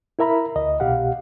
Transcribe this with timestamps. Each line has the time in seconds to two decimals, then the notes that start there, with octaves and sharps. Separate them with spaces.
0.19 E4 A#4 E5 A#5 B5
0.56 D2 D#5
0.80 C2 B2 G4 F5 F#5